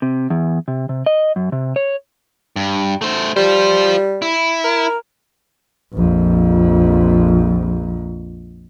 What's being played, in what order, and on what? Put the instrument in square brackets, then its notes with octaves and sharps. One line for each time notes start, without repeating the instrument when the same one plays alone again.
[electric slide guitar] C3
E2
C3
C3
D#5
F#2
C3
C#5
[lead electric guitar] G2
A3 C5
[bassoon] G3 [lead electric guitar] F4 C5
[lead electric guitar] E4
[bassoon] A#4
[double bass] A#1 F2